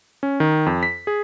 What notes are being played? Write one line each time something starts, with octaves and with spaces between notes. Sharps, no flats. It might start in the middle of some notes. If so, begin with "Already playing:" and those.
C#4
D#3
F2
B6
G#4